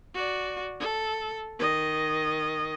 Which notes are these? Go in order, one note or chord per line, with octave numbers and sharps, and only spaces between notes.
F#4 D5
A4
D#3 D#5